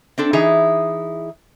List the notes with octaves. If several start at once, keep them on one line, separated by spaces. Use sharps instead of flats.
C4 D4 A4
E3 D#4 E4 G#4